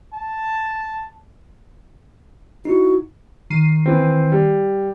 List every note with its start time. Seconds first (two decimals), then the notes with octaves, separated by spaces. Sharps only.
0.14 A5
2.65 D#4 E4 F#4
3.50 D#3 C7 D#7
3.86 E3 C4
4.32 G3